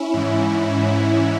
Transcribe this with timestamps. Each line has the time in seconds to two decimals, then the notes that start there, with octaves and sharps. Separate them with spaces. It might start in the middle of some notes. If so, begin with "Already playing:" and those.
Already playing: C#4 E4
0.14 G#2 E3